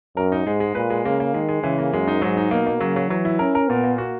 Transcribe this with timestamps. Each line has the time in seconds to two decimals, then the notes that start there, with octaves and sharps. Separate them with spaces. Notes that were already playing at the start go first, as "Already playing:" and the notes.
0.16 F#2 A#4
0.32 D#4
0.46 G#2 G#3
0.60 G#3
0.75 A#2 B4
0.90 G#3
1.05 C#3 A#3
1.20 A#3
1.34 D#3 G#3
1.48 G#3
1.63 C#3 E3
1.78 A#3
1.93 F#2 G#3
2.08 D#4
2.22 G#2 F#3
2.37 D#4
2.51 B2 A#3
2.67 A#3
2.80 C#3 F#3
2.96 F#3
3.10 E3 F#3
3.25 E4
3.39 C#4 A#4
3.55 A#4
3.68 A#2 B3
3.84 A#3
3.98 F#4